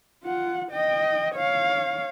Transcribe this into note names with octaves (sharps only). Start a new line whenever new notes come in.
F4 F#5
D#5 G5
C#5 F5